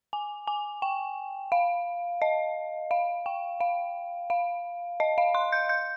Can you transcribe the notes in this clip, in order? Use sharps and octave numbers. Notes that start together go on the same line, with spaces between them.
G#5
G#5
G5
F5
D#5
F5
G5
F5
F5
D#5
F5
C6
G6
G6